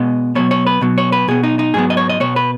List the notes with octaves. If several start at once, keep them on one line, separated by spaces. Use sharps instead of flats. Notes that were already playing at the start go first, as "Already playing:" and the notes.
Already playing: B2 G#3 B3 D#5
B2 F#3 B3 C#5
C#5
B4
B2 F#3 B3
C#5
B4
B2 B3 G#4
D#4
D#4
G#2 F#3 B3 G#4
D#5
C#5
D#5
B2 B3 C#5
B4